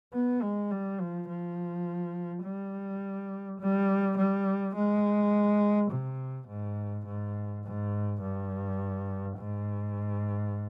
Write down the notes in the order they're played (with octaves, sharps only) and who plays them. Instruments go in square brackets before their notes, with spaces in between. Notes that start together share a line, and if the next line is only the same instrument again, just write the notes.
[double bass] B3
G#3
G3
F3
F3
G3
G3
G3
G#3
C3
G#2
G#2
G#2
G2
G#2